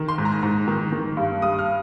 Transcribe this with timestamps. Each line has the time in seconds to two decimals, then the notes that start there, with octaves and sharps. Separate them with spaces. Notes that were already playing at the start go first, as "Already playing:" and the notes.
Already playing: D#3
0.08 C6
0.18 G#2
0.25 A#5
0.43 G#2
0.68 D#3
0.92 D#3
1.17 G2
1.42 G2 D#6
1.59 F6